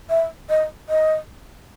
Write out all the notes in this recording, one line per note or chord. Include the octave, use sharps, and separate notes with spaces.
E5
D#5
D#5